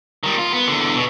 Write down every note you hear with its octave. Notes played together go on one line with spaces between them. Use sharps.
D#3 G3
F4
B3
E2 D3
B2